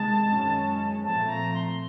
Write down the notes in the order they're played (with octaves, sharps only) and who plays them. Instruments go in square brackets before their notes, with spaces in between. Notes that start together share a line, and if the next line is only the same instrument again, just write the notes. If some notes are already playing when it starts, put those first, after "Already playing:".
Already playing: [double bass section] C3 D#3 G#3 [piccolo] A5
[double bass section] F#2 D#3 G#3 C#4
[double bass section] A#2 F3 A3 C4 [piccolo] A5
[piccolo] A#5
C6